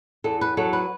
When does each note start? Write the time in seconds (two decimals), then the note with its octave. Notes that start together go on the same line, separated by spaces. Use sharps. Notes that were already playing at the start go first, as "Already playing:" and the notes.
0.24 E2 A4
0.41 B4
0.57 F#3 A4
0.73 B4